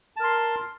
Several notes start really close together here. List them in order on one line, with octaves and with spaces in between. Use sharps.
A5 A#4 C6